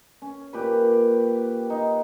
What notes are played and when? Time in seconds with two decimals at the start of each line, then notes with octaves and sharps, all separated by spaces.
0.22 C#4
0.53 A#2 G4 B4
1.70 D#4 F5